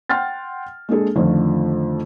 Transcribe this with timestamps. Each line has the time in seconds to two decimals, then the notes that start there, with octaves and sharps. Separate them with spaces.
0.09 F#5 G5 C6 F6 A6
0.89 G#3 A#3 D4 G#4 A4
1.15 F2 D3 D#3 F3 A3